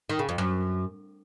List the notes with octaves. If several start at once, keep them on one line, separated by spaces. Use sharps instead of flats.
D#3
C#3
F2
F#2